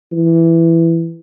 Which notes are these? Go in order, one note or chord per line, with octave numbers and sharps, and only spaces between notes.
E3